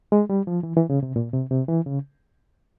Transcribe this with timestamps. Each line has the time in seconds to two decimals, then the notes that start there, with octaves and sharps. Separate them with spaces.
0.12 G#3
0.30 G3
0.47 F3
0.63 E3
0.76 E3
0.90 C#3
1.03 C3
1.16 A#2
1.33 C3
1.51 C3
1.68 E3
1.86 C#3